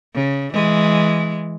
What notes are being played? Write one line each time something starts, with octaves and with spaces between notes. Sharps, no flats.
C#3
E3 G#3